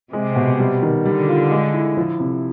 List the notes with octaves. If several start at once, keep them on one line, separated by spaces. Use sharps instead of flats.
C3 G#3
B2
G3
D#3
D3 G3
F4
G#3
E4
F3
C3